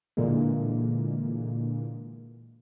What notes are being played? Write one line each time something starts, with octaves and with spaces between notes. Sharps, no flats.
A#2 D3 E3 G#3 A#3